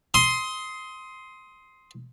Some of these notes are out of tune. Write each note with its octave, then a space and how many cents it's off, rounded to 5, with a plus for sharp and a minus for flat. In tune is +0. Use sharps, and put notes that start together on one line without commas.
C6 +0 D#6 +25